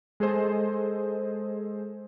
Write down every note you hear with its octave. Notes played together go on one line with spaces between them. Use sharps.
G#3 G#4 A4 C5 D#5